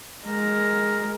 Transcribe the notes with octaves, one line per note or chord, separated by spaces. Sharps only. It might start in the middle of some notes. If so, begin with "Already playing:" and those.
G#3 A#4